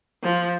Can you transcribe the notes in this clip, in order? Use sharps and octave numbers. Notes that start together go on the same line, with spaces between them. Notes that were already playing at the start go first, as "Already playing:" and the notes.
F3